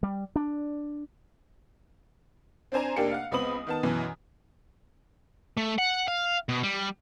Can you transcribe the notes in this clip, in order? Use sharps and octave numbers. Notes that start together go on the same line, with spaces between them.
G3
D4
C4 D4 C5 G#5 A#5
F1 A#3 D4 G4 C#7
F5 F#5
C#2 B3 C4 B5 D#6 F#7
D#3 B3 A5
F#2 B2 E3
A3
F#5
F5
B2
G3